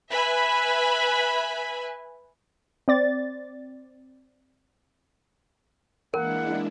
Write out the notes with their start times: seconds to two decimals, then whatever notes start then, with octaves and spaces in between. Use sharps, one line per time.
0.10 B4 E5 G#5 B5
2.88 C4 D5 A6
6.14 E3 G#3 A#3 D4 E4 A#4 F#5